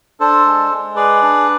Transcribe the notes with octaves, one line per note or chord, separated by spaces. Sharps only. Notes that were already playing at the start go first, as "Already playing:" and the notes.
D4 A4 C5
G#3
G#3
G#4 B4 D5
D4